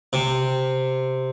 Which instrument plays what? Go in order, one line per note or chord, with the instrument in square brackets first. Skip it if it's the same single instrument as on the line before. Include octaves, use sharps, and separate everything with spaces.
[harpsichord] C3